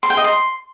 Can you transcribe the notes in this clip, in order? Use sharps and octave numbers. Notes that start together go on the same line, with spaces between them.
C6
G5
D#5
C6